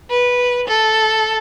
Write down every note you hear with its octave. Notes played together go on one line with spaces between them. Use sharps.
B4
A4